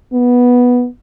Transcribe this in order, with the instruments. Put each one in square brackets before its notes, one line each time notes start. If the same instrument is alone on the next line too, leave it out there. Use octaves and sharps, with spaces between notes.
[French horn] B3